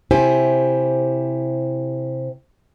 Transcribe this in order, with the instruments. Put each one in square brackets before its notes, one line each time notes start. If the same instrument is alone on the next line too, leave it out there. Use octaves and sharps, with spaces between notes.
[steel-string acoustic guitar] C3 E4 G4 C5 G#5